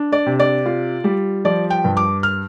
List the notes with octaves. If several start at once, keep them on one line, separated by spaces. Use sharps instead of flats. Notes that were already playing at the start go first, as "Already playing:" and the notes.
Already playing: D4
D5
C3
D5
F4
G3
F3 D5
G5
G2
D6
F6